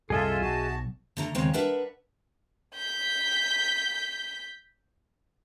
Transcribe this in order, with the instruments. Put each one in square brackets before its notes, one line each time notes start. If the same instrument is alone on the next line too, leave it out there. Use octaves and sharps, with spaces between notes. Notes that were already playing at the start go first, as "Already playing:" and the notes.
[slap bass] C2 F#2 [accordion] F4 A4 [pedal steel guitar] G#4 D#5 E5
[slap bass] B1 [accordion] F#4 A5
[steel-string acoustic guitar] D3 A3 A#5
D#2 C#3 G#3 C4 C#5 F5
D4 A#4 B4 E5 F#5
[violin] G6 B6